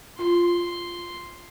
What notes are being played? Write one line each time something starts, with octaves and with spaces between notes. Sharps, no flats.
F4 C6